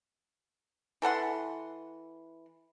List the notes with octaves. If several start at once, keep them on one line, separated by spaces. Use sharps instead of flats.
E3 A4 F#5 C6